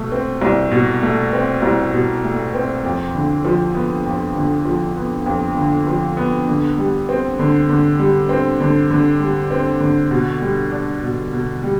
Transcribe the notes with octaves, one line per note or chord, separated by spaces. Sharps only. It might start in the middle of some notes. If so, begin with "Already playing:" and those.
Already playing: B2 A3
C4
C2
B2
A3
C4
C2
B2
A3
C4
F2
D3
F3
B3
F2
D3
F3
B3
F2
D3
F3
B3
D3
G3
C4
D3
D3
G3
C4
D3
D3
G3
C4
D3
B2
G3
D4
B2
B2
G3